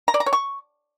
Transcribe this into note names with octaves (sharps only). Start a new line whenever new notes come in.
A#5
D5
A#5
C#5
C#6